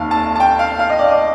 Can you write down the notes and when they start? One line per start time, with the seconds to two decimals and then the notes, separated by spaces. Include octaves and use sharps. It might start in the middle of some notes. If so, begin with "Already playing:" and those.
Already playing: F1 D#2 D#3 F5 A5
0.11 A5
0.36 A5
0.40 G5
0.59 F5
0.79 F5
0.89 D#5
0.99 D5
1.08 D#5